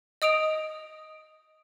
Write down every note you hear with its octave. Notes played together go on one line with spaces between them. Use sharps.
D#5 D#6 D7 F7